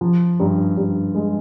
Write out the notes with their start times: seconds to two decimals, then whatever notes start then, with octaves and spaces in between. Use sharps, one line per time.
0.01 F3
0.40 G2
0.77 G2
1.15 G#3